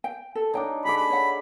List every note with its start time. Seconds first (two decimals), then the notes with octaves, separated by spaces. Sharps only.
0.04 G5
0.35 A4
0.54 D4 D#4 C#5 G5
0.85 G#4 A4 B5 D6
0.97 B5
1.10 C#5 F#5